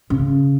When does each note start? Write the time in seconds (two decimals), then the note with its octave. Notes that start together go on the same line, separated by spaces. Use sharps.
0.10 C#3